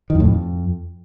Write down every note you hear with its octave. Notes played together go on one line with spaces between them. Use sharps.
D#3
F2
A2
F2